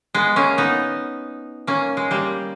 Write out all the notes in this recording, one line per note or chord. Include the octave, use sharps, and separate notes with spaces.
G#3 B3
A#3 C#4
B3 D#4
A#3 C#4
G#3
G3 A#3